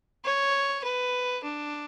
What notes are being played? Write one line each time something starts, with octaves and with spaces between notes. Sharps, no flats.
C#5
B4
D4